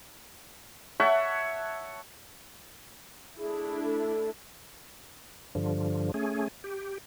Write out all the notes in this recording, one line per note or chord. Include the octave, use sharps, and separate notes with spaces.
A4 C#5 E5 F#5
A3 D4 E4 G#4
A4
G2 D3 F3
A3 C#4 G#4
G4